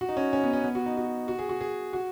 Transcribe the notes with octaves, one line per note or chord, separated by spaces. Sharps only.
F#4
D#4
C#4
C#4
B3
C#4
B3
F#4
D#4
F#4
F#4
G#4
F#4
G#4
F#4